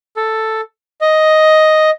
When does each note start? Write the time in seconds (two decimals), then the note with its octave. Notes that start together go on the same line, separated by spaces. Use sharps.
0.17 A4
1.01 D#5